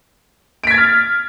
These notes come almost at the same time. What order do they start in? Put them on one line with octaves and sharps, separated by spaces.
D7 B6 G#6 A6 F6